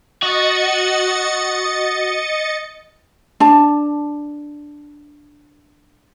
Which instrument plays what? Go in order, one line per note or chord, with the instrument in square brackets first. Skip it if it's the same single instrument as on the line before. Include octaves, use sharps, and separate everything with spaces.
[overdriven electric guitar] F#4 [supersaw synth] D#5 A6 C#7
[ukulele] D4 A5